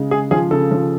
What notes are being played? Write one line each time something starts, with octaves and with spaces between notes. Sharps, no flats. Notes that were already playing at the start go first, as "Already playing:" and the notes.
Already playing: C#3 G#3
G#3 G#4
F3 G#4
C#3 A4
F3